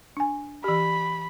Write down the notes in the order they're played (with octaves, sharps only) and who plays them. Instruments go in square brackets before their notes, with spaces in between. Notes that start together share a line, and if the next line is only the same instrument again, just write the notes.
[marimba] D4 G#5
[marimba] E3 G4 [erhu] B5